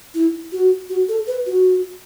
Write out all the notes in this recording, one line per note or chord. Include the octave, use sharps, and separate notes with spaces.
E4
F#4
F#4
A4
B4
F#4